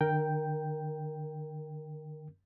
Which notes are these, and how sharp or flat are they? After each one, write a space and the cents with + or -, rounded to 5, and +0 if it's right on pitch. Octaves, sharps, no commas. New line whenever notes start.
D3 +45 A#4 +0 G5 +0